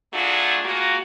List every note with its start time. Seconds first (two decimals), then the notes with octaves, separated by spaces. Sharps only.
0.13 F#3 A3 D4 F4 F#4 G#4
0.63 G#3 A#3 F4 F#4